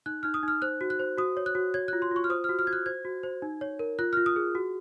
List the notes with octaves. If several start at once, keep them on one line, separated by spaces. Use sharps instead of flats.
D#4 F#6
D#4 F6
D#6
D#4 F6
C5 F#6
F#4
F#6
C5
F#4 D#6
C#5
F#6
F#4
C#5 G#6
F4 F#6
C6
F4 C#6
F6
C5 D#6
F#4 F6
F6
F#4 G#6
F#6
C5 G#6
F#4
C5
D#4
C#5
A#4
F4 F#6
F4 F6
D#6
G#4
F#4